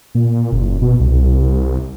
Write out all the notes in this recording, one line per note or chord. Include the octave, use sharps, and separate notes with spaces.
A#2
F#1
B2
C2